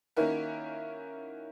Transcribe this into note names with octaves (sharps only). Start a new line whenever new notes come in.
D#3 A#3 C#4 E4 F#4 A#4